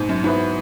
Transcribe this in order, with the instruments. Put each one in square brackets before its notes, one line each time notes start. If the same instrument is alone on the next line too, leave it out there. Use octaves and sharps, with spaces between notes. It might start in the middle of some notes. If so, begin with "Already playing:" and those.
Already playing: [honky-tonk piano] G#2 [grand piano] B2
[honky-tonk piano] F#2
[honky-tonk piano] G#2 [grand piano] F#3 B3 E4 B4